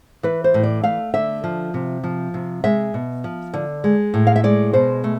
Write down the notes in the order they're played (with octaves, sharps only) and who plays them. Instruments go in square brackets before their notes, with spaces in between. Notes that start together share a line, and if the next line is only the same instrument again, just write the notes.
[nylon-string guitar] E3 B4
C5
A2
D5
A3 F5
D3 E5
F3
C3
F3
C3
G#3 E5
B2
F3
D3
G#3
A2
F5
E5
G#3 D5
B2 C5
A3